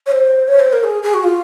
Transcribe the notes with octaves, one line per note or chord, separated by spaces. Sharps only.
C#5
C5
C#5
C5
A#4
G#4
G#4
F#4
F4